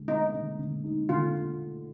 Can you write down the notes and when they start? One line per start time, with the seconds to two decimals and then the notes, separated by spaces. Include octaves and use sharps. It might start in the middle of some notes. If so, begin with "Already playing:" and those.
Already playing: D3 G#3
0.08 B3 D#4
0.34 D3
0.59 D3
0.84 D#4
1.09 D3 F4